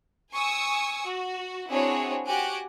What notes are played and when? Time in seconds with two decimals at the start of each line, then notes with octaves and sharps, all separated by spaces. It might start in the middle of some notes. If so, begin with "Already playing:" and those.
0.33 G#5 C#6 D#6 E6
1.07 F#4
1.69 C4 D4 E4 F#4 G#4 C#5
2.26 F#4 G4 G#5 F#6 D7